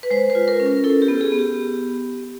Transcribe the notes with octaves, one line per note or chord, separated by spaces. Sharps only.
B4
G#3 C5
B4
F4
A#4
C#4
A#4
E4 A4
G4
B3
G#4
B3
G4